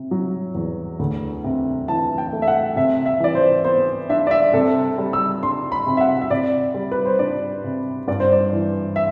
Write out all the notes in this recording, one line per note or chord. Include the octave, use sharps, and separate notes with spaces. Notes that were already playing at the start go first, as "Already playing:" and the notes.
Already playing: C3
F#3
E2
D2
C3
E3 A5
G5
A3
E5
F#5
C3 E5
E5
E3 D5
C5
B3 C5
D4 E5
D5
E5
C3 A4
G3
E6
D4 C6
B5
C3
E5
F#5
E5
C3 D5
G3
B4
C5
D4 D5
C3
G2 D5
C5
D5
E3
E5